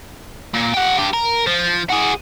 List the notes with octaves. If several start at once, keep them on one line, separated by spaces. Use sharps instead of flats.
A#2
G4 F#5
G2 G4
A#4
F3
F#4 G#4